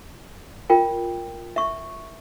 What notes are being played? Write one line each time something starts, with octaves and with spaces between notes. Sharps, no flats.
F4 A#4 G5
E5 C#6